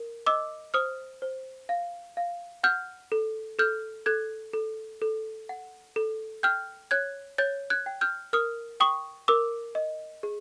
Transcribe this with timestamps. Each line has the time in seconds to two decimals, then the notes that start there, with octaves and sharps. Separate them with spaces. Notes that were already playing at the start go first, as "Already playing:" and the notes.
Already playing: A#4
0.26 D#5 D6 E6
0.74 C5 D#6 F6
1.22 C5
1.69 F5
2.17 F5
2.63 F#5 F6 G6
3.12 A4
3.59 A4 F6 G6
4.06 A4 F#6 G#6
4.53 A4
5.02 A4
5.49 F#5
5.96 A4
6.43 G5 F6 G6
6.91 C#5 F#6 G#6
7.38 C#5 G6 A6
7.70 F#6 G#6
7.86 G5
8.01 F6 G6
8.33 A#4 D#6 F6
8.80 G5 C#6 D#6
9.28 A#4 D6 E6
9.75 D#5
10.23 G#4